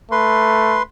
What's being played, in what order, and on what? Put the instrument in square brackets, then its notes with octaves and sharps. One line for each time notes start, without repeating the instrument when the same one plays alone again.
[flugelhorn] A3 [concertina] B4 C6